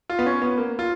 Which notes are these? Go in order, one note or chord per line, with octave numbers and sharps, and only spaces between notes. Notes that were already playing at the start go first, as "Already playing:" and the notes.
F4
B3
C#4
B3
A#3
F4